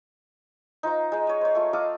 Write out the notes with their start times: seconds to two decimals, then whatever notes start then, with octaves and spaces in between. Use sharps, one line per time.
0.83 D#4 F4 C5 A#5
1.12 G#3 D#4
1.27 C#5 D#5
1.41 C5 C#5
1.55 A3 F4
1.73 A4 D#5 F5 D6